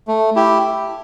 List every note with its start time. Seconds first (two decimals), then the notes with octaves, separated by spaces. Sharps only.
0.08 A3
0.36 E4 G4